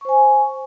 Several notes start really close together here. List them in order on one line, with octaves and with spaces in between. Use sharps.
C#6 C5 G#5